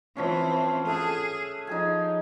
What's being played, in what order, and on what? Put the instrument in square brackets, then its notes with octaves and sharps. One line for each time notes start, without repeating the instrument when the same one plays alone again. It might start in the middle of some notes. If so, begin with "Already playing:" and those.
[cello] E3 C4 [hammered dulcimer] F3 C#4
[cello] G#4 [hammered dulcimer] A4 E5 F#5
[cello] F3 [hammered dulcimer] D#4 G#4 G#5